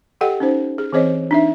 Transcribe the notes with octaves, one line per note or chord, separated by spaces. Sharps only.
G4 A4 D#5 F#5 G5
C#4 D#4 C5
G#4
E3 C4 G#4 C5 C#5 D#5
D4 D#4 E5